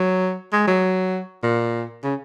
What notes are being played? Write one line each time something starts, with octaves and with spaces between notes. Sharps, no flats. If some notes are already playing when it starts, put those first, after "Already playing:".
Already playing: F#3
G#3
F#3
A#2
C#3